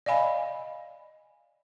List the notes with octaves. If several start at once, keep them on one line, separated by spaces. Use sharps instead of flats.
D5 D#5 F5 G#5 B5